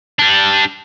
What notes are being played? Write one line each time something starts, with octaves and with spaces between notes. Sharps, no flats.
G3 D4